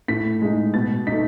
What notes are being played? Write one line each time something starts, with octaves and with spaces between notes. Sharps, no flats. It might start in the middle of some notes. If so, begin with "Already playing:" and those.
A2 B6
G#3 D#4
B2 A6
D#4 B6
A3